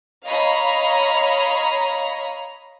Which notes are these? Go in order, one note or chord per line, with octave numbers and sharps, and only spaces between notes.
C#5 D#5 F5 A#5 B5